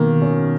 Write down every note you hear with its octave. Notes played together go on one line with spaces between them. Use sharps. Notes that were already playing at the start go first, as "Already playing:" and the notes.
Already playing: B2 D#3 A#3
C#4